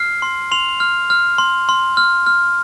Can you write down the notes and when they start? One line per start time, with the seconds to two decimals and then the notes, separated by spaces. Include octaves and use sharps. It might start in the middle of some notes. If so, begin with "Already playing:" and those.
Already playing: F6 C7
0.22 C6
0.52 C6 F7
0.80 F6
1.10 F6
1.38 C6
1.69 C6
1.97 F6
2.27 F6